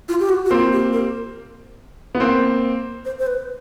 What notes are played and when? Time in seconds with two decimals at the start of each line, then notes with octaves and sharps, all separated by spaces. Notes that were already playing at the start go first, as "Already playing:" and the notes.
0.09 F4
0.20 G4
0.29 F#4
0.45 F#4
0.50 A#3 C4 F4
0.73 G4
0.93 A#4
2.15 B3
2.20 A#3 C4
3.05 C5
3.19 C5
3.27 B4